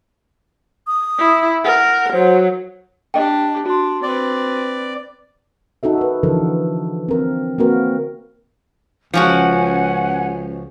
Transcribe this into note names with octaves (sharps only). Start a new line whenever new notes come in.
D#6
E4
A#4 F#5
F#3 C5
D4 G4 D#5 G5
D4 F#4 C6
C4 B4 D5
D#4 F#4 A4 E5
A#4 B4
D3 E3 F3 A4 A#4
C4 A#4
A#3 C4 F#4 A#4 B4
C#2 F3 C#4 F#4 F#5 G#5